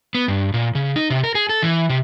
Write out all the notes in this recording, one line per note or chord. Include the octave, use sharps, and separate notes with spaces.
B3
G2
A#2
C#3
D#4
C3
A#4
G#4
A4
E3
C3